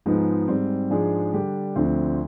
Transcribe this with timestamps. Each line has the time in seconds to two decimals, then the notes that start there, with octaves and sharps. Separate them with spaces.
0.06 G#2 F3 G#3 B3 D#4
0.48 G#2 G3 C4
0.90 G#2 F3 G#3 D4 G#4
1.33 D3 G3 D4 G4
1.76 D2 D3 F3 C4